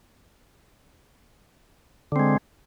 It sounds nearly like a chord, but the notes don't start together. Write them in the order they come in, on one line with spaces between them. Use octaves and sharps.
D3 C4 G#3